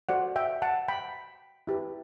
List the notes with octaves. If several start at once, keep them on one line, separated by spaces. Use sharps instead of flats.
F#4 A4 C5 D5 F#5
E5 G5
F#5 A5
G5 B5
E4 G4 B4